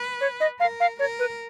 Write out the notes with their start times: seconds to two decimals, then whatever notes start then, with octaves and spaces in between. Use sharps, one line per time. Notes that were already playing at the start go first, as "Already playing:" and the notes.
Already playing: B4
0.21 C#5
0.40 D#5
0.60 A#4 F5
0.80 F5
0.99 A#4 C#5
1.19 B4